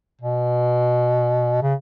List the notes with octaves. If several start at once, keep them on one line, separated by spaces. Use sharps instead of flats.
B2
C#3